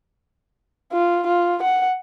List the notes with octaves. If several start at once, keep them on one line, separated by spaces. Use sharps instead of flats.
F4
F4
F#5